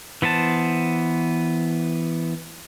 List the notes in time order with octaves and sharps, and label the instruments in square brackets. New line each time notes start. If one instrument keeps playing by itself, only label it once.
[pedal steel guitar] E3 B3 C5 A5